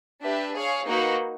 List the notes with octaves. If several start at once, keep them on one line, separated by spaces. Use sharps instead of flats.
D4 G4 B4 E5
G#4 C#5 F5
A#3 D#4 F#4 B4